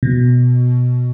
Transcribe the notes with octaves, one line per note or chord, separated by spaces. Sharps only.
B2